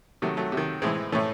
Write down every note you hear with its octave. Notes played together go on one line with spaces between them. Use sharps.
C3 D#3 F#3 A3
F#3 A3
C3
D#3
A2 E3 G#3 C4
A2 E3 A3 C#4